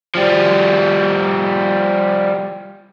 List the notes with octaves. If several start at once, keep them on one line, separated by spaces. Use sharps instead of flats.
F3 G3